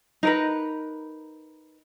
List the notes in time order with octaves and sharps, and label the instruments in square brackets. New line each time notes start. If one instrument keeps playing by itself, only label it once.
[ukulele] D#4 A#4 B4